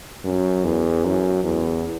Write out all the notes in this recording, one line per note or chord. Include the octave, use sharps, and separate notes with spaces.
F#2
E2
F#2
E2